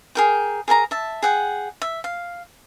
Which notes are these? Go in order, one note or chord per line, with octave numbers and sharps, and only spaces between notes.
G#4 A#4 G5
G#4 A#4 G#5 A#5
E5 A5
G#4 F#5 G5
E5
F5